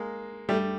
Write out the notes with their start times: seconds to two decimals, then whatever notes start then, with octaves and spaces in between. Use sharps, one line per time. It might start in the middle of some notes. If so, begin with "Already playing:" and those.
Already playing: G#3 A#3
0.49 G3 A3